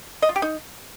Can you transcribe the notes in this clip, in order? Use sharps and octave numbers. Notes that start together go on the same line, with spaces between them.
D#5
F4
G4
D#4